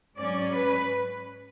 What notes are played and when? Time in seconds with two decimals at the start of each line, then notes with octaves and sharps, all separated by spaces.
0.17 G#2 F#3 C#4 D5
0.55 B4